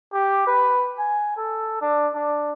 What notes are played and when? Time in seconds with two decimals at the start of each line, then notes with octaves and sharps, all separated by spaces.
0.13 G4
0.47 B4
0.99 G#5
1.37 A4
1.82 D4
2.15 D4